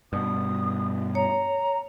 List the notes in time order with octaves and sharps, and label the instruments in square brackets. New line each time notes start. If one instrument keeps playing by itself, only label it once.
[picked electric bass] G2 B2 [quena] D#6
[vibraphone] C#5 [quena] A#5